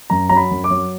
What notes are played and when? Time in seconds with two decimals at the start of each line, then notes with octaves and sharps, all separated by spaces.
0.10 F#2 A#5
0.29 F#3 A#5
0.37 B5
0.51 F#2
0.64 D6
0.71 F#3